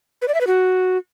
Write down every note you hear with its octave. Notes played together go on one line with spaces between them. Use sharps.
B4
D5
E5
B4
F#4